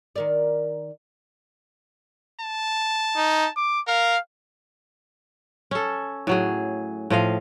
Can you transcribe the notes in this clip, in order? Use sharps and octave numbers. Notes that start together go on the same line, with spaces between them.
D#3 A#4 D5
A5
D#4
D6
A#4 F5
C#4 A4
A2 F#3 G#4
A2 F3 D#5 F5